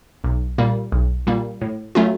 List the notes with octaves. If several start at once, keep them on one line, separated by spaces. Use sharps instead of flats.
B1
A#2 G3 A#3
B1
A#2 G3 A#3
A2
F#3 A3 C#4 F4